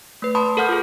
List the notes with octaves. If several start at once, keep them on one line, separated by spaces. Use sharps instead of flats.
A3 B4
A5 B5 C6 D#6
A4 A#4 F#5 F6 G6
F4 G#4